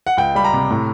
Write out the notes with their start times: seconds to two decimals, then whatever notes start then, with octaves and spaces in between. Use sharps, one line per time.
0.07 F#5
0.17 C#2 G5
0.35 G3 B5
0.44 A#5
0.53 C3
0.70 A2